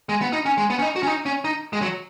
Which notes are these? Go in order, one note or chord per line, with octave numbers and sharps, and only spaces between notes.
G#3
B3
D#4
C#4
G#3
B3
C#4
D#4
F#4
C#4
D#4
C#4
D#4
G#3
F#3